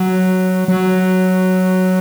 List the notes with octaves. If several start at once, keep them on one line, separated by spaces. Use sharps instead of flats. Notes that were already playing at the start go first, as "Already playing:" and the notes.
Already playing: F#3
F#3